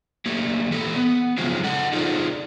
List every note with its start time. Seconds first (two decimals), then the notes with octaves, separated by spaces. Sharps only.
0.26 A3 A#3 G4
0.71 E3 G4 A4
0.95 B3
1.38 C#3 F3 F#3 G#3 C4
1.64 A4 D#5 F#5
1.93 D#4 F4 G#4 A4 C5 D5